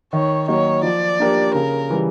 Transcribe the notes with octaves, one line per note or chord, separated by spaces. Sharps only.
D#3 C#5
F#3 A#3 D#4 C#5
F3 D5
A#3 D4 G4 A#4
C#3 A#4
E3 G3